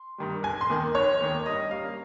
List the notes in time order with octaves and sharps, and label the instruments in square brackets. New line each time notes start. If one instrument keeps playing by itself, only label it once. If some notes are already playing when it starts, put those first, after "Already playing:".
Already playing: [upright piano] C6
G2 D#3 G3
F1 G#5
C6
D#2 D#3
F1 C#5
D#2 D#3
G2 D#5
G3 A#3 C#4 F5